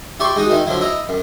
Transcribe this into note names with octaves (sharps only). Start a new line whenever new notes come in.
E4 G4 D5 C6 C#6
G#3 D#4 F#4 D#6
D#3 D#4 E4
D3 F3 F#3 E4
E4 D#5 A#5
F#2